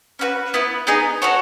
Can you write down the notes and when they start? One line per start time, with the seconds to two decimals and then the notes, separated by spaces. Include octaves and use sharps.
0.19 C#4 F#4 B4
0.54 B3 E4 B4
0.87 B3 D#4 G#4 D#5
1.22 F#4 A4 C#5 F#5